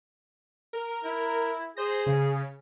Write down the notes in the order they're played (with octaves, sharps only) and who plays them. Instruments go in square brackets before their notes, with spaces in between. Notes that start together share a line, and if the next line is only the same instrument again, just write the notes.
[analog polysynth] A#4
[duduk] E4
[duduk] G#4 [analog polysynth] C5 A#6
[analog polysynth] C#3